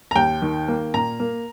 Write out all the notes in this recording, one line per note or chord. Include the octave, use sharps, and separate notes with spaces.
A#5
D#2 G5
D#3
A#3
A#2 A#5
A#3